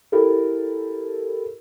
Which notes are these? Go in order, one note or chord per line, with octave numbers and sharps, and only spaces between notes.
E4 G4 A4 A#4